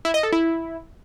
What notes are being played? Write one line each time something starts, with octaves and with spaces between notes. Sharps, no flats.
E4
D#5
A4
E4